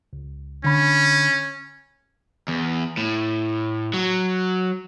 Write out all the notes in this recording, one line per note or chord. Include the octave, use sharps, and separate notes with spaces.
C#2
D3 C#4 B5
E2
A2
F#3